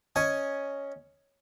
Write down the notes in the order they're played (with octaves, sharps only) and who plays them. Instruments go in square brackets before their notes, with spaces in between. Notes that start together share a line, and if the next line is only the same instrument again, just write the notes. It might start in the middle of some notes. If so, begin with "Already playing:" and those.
[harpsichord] C#4 D#5 G#5